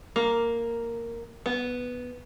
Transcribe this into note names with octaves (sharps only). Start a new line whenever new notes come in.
A#3
B3